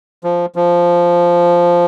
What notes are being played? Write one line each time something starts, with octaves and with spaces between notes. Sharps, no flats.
F3
F3